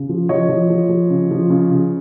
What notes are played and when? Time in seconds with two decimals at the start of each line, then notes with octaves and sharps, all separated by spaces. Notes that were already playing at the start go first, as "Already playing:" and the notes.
Already playing: C#3
0.09 F3
0.29 F3 C#5 D#5
0.49 F3
0.70 F3
0.89 F3
1.10 C#3
1.31 F3
1.50 C#3
1.71 C#3